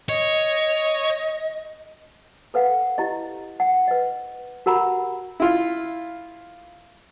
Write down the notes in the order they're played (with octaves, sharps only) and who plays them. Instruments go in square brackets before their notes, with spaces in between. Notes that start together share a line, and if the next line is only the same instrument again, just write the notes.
[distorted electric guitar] C#5 [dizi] D#5
[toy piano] A4 B4 F5 F#5
E4 G4 D#5
F#5
B4 D#5
F#4 G4 A#4 F#5 A#5 B5
[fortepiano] E4 F4